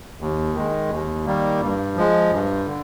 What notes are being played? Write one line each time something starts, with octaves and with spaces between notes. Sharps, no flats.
D#2
D#3 G#3
D#2
D#3 G3 A#3
G2
F3 G#3
G2
D3